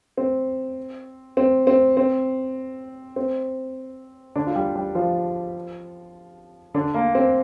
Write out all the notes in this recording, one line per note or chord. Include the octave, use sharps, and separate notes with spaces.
C4
C4
C4
C4
C4
D3 D4
F4
G3 G4
G3 G4
F3 F4
D3 D4
A#3
C4